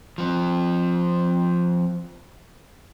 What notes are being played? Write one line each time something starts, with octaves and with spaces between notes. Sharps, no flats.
F3 C4